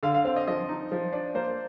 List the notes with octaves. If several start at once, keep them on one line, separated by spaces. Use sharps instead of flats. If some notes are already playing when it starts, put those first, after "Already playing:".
D3 F5
F5
C4 F5
D#5
F3 D#5
D#4
F3
D4
A#3 C5